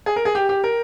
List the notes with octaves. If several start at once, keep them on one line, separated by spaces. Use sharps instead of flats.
G#4
A#4
G#4
G4
G4
A#4